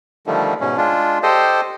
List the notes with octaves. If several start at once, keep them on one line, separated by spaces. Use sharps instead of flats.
D3 D#3 F3 G3 A3
G#2 B2 C#4
G#3 D4 F4
G4 A4 C5 D#5